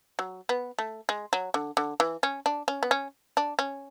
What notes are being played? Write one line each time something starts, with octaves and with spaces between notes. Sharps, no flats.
F#3
B3
A3
G#3
F#3
D3
D3
E3
C#4
D4
C#4
B3
C#4
D4
C#4